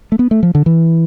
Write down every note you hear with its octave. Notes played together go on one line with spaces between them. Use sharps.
A3
B3
A3
F3
D3
E3